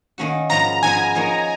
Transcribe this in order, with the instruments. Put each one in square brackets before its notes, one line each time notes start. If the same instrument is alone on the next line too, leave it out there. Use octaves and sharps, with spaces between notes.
[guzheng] D#3 A#3 C#4 F#4
[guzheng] G#2 F3 B3 F4 [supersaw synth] A#5
[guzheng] G#2 F3 B3 F4 [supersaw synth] G#5
[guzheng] F3 A#3 D#4 A#4 C#5